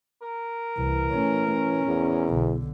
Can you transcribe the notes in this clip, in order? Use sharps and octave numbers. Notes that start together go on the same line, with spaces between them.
A#4
C2 E3
A3 C#4
C#4
E2
B1 D3